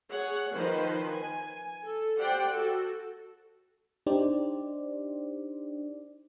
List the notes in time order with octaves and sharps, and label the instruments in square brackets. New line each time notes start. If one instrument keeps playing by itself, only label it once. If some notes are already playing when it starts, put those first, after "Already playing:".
[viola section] G#4 C#5 F#5
D#3 F3 B4 C5
G#5
A4
G4 C5 D5 F#5 G5
F#4 A4
[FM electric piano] D4 D#4 G4 C5 D5